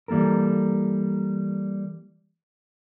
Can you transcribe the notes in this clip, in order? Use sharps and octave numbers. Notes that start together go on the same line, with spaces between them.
E3 G3 A#3 A4 A#4